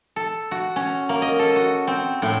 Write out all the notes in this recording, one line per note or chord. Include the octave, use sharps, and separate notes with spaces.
A4
F#4
C#4
A#3
D#5
A4
F#4
C4
A2